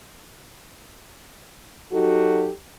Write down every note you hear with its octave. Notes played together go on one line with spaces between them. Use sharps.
F#3 D#4 F#4 G4 A4